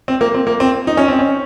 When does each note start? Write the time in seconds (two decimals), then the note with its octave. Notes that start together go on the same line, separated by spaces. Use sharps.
0.08 C4
0.21 A#3
0.35 C4
0.47 A#3
0.60 C4
0.87 D#4
0.97 C#4
1.08 C4
1.19 C#4